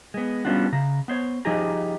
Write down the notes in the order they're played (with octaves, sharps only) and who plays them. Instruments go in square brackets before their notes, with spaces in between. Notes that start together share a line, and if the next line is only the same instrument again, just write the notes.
[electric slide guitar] G#3 B3
G3 B3 C#4 D4 F4 F#4
C#3 A#5
B3 C5 C#5
F3 D#4 G4 G#4 A#5